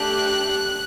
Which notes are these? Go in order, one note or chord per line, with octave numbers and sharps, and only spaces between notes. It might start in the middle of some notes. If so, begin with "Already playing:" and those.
Already playing: A3 D4 G4 F#6